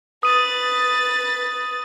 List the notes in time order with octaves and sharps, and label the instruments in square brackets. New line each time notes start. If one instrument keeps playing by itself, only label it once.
[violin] B4 A6 [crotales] D#6 D#7